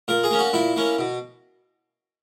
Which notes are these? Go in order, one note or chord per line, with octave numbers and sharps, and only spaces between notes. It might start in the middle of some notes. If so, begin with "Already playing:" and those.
A#2 A#4
G#4
A#3 C#4
F#4
A#2 E4
A#3 C#4
B2